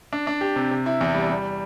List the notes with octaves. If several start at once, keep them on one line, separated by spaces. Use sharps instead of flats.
D4
D4
G4
C3
C3
E4
E2
G3
G3